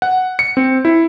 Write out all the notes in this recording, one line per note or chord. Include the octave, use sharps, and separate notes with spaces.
F#5
C#7
C4
E4